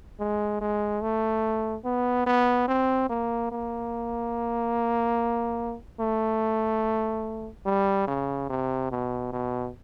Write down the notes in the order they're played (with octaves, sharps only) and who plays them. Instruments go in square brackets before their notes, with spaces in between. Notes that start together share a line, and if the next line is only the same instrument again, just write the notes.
[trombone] G#3
G#3
A3
B3
B3
C4
A#3
A#3
A3
G3
C#3
C3
B2
B2